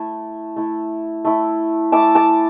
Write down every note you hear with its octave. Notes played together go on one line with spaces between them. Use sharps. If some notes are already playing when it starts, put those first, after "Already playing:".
Already playing: A3 E4
A3 E4
A3 E4
A3 E4 A5 D6
A5 D6